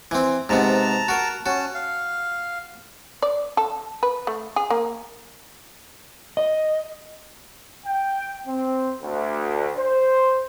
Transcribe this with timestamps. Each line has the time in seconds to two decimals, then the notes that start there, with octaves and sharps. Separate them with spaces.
0.11 E3 C4
0.49 G#2 C3 B3 A5 A#5
1.08 F#4 A#4
1.46 C#4 F#4 A5
1.75 F5
3.22 D5
3.57 A4
4.03 B4
4.27 A3
4.56 G#4
4.70 A#3
6.37 D#5
7.86 G5
8.47 C4
9.02 D2
9.78 C5